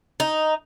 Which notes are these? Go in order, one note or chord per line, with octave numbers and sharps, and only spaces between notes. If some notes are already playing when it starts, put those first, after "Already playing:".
D#4